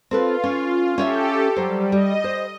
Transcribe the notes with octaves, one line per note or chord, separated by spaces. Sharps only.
C4 F4 A4 B4
C#4
C#4 G4 A4 C#5 E5
F#3 G3 C5
G3 D#5
C5